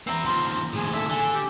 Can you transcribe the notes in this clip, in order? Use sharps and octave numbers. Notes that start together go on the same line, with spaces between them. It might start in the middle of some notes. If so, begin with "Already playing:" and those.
B3 C4 E4 A#5
D#2 F3 C6
D#2 A2 G#4
A4 E5
D3 G#5
G4